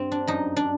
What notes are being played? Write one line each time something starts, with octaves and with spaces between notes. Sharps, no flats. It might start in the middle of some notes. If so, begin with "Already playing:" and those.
Already playing: G2 C4
D4
F#2 D#4
D4